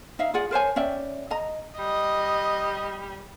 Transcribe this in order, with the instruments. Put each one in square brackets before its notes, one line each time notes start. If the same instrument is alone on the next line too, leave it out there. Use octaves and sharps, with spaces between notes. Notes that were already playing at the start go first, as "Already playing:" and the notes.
[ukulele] D#4 E5 F5
F4 G#4 D5 F#5
A#4 C5 C#5 G#5
C#4 D5 E5 G5
D#5 A#5
[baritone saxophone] G3 [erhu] D#5